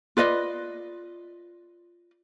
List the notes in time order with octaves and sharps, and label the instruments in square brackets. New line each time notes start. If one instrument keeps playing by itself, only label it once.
[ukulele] F4 B4 D5 D#5